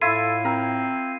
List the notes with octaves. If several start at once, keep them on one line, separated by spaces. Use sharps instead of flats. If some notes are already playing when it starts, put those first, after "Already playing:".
A2 E4 F4 A4 C7 D#7
C4 A#4